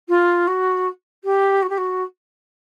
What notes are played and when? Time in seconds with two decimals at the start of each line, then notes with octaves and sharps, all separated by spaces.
0.08 F4
0.47 F#4
1.24 G4
1.62 F#4
1.69 G4
1.77 F#4